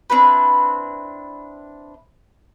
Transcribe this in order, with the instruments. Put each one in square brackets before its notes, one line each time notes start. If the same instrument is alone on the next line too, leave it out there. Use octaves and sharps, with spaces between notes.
[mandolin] C4 D4 E4 B4